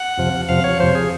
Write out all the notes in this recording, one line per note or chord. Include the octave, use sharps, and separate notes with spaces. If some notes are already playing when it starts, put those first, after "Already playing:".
Already playing: F#5
F2 C3 F3
F2 C3 F3 F5
C#5
F2 C3 F3 C5
G#4